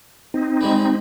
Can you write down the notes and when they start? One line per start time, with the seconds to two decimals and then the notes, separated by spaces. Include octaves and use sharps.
0.34 C4 D#4
0.61 G3 G#3